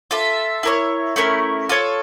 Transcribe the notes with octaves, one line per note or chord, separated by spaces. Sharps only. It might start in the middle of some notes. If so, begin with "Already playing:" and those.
F4 A4 E5
E4 A#4 C#5
A3 C#4 E4 A#4
F4 A4 C#5